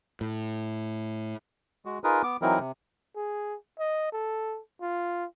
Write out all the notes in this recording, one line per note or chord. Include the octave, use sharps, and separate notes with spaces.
A2
G#3 F#4
D#4 F4 G#4 A#4 B4
B3 D6
E3 F#3 C4 D#4 E4 A#4
C3
G#4
D#5
A4
F4